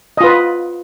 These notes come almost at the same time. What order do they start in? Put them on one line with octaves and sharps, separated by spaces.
D#5 F4 B4